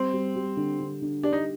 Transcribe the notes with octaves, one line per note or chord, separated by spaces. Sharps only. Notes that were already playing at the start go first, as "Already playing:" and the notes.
Already playing: G3 C4
G3
G3
D3
D3
D3
D4 G4
D#4